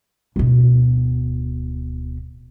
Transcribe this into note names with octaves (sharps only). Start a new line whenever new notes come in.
D1 B2